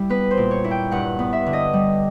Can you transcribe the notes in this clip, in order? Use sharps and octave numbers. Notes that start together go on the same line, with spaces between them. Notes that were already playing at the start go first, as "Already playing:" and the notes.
Already playing: G3 E4
B3 B4
C5
A#2
C#5
E4
G5
G2 F#5
B3
E5
D3
D#5
G3